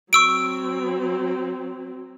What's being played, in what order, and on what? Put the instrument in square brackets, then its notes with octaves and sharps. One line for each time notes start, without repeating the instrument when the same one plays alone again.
[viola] F#3 C4 [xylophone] C#6 E6 D7